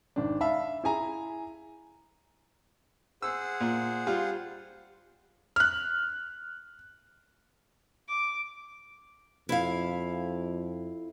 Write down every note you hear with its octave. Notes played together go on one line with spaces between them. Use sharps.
G#1 D4
E5 F5 A5 B5
E4 G#4 G#5 A#5
G#4 C5 F#5 E6
A#2
G3 F4
F6 F#6
D6
F2 E4 F5